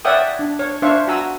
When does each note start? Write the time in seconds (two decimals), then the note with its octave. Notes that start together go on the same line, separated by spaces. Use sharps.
0.05 C#5 D5 E5 F#5 G5 D#6
0.39 D4
0.59 C#5
0.82 D4 C5 E5 F5 C#6
1.08 F#4 G#5 A#5 E6